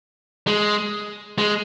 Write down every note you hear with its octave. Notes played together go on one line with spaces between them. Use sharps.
G#3
G#3